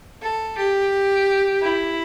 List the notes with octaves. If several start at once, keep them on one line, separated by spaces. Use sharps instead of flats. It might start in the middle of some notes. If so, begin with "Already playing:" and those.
A4
G4
E4